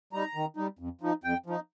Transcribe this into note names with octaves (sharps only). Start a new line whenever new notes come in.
G3 D#4 A#5
D#3
G3 D#4
F2
F3 D#4
F2 G5
F3 D#4